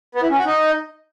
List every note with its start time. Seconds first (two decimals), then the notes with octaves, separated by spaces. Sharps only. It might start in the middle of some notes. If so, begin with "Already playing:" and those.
0.15 B3
0.23 E4
0.30 C#4
0.38 F#4
0.46 D#4